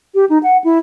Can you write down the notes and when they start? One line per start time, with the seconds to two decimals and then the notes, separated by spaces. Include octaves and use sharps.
0.15 G4
0.29 D#4
0.43 F#5
0.64 E4